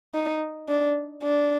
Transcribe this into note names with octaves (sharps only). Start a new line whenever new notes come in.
D#4
D4
D4